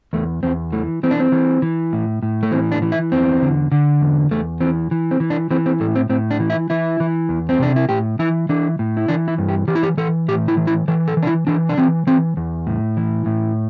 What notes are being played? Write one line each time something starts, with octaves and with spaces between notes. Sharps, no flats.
E2 A3
E2 C4
E3 A3
E3 C4
D4
C4
E3
E3
A2
A2
A3
E3 C4
D4
E3
E4
E2 C4
D3
D3
E2
E2 A3
E3 C4
E3
C4
E3
D4
E3 C4
C4
A2 A3
C4
A2 C4
D4
E3
E4
E3 E4
E3
E2
C4
C3 D4
E4
A2 G4
E3 E4
E3 D4
A2
E4
E3 D4
E4
G2
G4
E3 G4
E4
G4
E3 A4
A2 G4
E4
E3
E4
E3 A4
A4
E3
D4
E4
E3 D4
D4
E3 C4
E3 C4
E2
A2
E3
A2